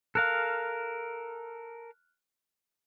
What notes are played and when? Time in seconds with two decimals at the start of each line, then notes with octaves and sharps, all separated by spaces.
0.15 A4 A#4 F5 F6 F#6